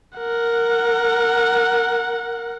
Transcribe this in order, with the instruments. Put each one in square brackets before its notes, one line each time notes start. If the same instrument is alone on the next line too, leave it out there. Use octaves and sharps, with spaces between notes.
[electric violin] A#4 F#5